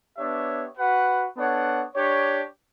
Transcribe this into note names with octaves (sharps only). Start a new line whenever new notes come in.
B3 D4 G4 C#5 E5
F#4 B4 F#5
B3 D4 A4 C#5 F#5
D4 G4 C#5